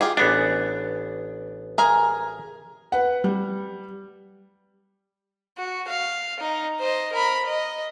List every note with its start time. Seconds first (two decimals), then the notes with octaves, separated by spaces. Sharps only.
0.01 F4 G4 G#4
0.17 A1 B3 D4 G#4
1.78 G#4 A#4 G#5
2.92 B4 F#5
3.24 G3
5.58 F#4
5.88 F5
6.40 D#4
6.79 C5 D#5
7.12 A#4 B5
7.46 D#5